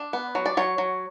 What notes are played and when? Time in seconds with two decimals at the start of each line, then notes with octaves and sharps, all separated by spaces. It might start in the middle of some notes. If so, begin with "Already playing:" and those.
Already playing: D4
0.13 B3
0.35 F#3
0.46 D5
0.57 F#3 C#5
0.78 F#3